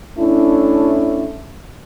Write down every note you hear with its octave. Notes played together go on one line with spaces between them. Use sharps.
A3 C#4 D4 E4